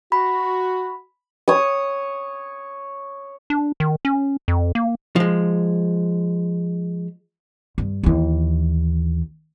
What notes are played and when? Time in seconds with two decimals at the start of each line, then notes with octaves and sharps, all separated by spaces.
0.12 F#4 B5
1.48 C#5 D#6
3.50 D4
3.80 D#3
4.05 C#4
4.48 F2
4.75 A#3
5.16 F3 G#3
7.78 G2
8.03 D#2 E3